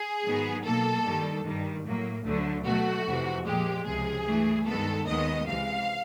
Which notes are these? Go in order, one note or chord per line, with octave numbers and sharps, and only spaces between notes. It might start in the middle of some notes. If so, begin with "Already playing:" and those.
Already playing: G#4
G#2 D#3 F#3 B3
B2 F#3 A#3 A4
G2 D#3 G3
G2 D#3 G3
A2 F#3 A#3
D2 D3 F#3 A3
B2 F#3 A3 F#4
F2 C3 E3
A#2 F3 G#3 G4
C#2 C3 F3 G#4
G2 E3 A3
G2 D#3 G#3 B3 A4
D#2 D#3 G#3 B3 D#5
C#2 C3 E3 G#3 F5